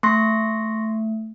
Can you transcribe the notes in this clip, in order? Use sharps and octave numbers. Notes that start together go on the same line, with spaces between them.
A3 C6 C#6 A#6